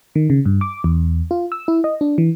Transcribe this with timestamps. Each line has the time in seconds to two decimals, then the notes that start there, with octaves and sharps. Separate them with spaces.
0.15 D#3
0.30 C#3
0.45 G2
0.61 D6
0.84 E2
1.31 F4
1.52 E6
1.68 E4
1.84 D#5
2.01 D4
2.18 E3